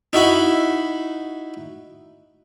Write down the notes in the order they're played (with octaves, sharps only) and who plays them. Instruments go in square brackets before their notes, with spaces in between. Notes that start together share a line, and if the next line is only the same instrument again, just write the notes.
[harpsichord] D#4 E4 F#4 B5